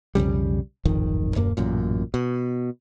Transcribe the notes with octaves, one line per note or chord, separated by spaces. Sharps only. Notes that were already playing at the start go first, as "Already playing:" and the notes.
B1 F2 C#3 G3
D1 G#1 F2 D#3
D#1 F#2 A#3
A1 F#2 A#2
B2